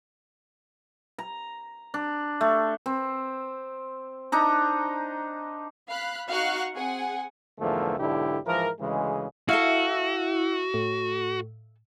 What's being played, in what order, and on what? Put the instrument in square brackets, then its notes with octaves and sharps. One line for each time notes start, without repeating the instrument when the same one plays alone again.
[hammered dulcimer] A#5
D4
A3
C4
D4 D#4 A#5
[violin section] F5 B5 F#6
D#4 F#4 F5 F#5 C#6 F#6
C4 G#4 F#5 G#5
[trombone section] E2 G#2 D3 F3 A3 A#3
B1 G#2 D3 D4 E4 G4
G#2 E3 F3 A#4
D2 C#3 E3 G#3
[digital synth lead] E4 [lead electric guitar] F#4 [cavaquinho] A4 E5 F5
[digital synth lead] A2